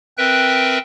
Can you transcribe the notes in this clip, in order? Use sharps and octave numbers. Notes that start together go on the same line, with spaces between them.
C4 A#4 B4 E5 G5 F#6